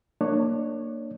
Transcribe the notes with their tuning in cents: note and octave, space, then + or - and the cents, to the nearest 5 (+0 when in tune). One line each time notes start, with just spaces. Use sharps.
A#3 -10 D4 +25 C#5 +0